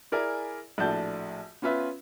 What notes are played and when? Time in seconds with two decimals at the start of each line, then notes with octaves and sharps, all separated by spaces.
0.12 E4 G#4 A#4 D5 E5 G#5
0.78 A#1 A2 D4 F#4 A5 G6
1.62 B3 C#4 F4 B4 E5